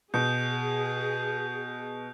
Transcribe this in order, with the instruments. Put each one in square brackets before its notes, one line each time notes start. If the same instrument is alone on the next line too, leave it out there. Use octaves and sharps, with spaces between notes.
[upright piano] B2 [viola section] G#4 [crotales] D#6 G6